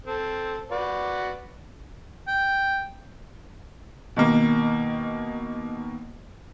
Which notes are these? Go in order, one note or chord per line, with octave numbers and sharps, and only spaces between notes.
C4 A4
F#4 B4 D5
G5
B2 D#3 A#3